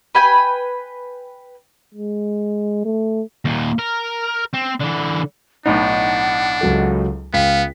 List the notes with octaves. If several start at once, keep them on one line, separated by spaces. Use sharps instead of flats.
B4 G5 G#5
G#3
A3
D#2 A#2
A#4
C4
D3 E3
B1 A2 D4 D#4 F#5
C#2 F#3 A4
C#2 B3 F5 G5 B6